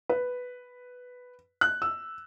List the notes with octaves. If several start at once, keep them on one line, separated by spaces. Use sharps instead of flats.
B4
F#6
E6